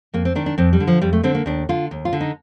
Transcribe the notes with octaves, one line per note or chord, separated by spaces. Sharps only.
F2 A#3
C4
D#3 D4
D4
F2 C4
G3
D3
F3
F2 G3
A3
D3 C4
A#3
D#2 D4
D3 F4
D#2
F4
D3
D#4